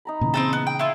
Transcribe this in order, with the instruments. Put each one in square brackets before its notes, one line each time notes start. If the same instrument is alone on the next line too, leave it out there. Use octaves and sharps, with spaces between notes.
[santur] D#4 A#5 B5
[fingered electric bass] A#2 C#3 E3
[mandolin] C4 D#4 A4 [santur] G#4
[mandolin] B3
G5
E4 F4